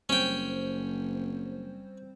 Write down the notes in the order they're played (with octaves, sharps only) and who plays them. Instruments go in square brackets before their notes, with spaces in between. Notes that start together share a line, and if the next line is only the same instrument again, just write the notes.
[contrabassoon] F#1 [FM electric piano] G3 C4 C5 [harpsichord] C#4 G5